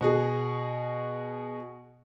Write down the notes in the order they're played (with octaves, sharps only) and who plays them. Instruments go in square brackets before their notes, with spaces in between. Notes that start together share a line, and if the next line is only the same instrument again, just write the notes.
[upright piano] B2 F#4 G#4